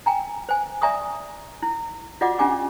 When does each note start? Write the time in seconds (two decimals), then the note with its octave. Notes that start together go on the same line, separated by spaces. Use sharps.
0.06 G5 G#5 A#5
0.49 C5 G#5
0.81 D5 E5 G#5 A#5 C#6 D#6
1.62 E4
2.21 F4 F#4 D5 D#5 F#5 D6
2.39 C#4 D4 F4 G4 G#5 D6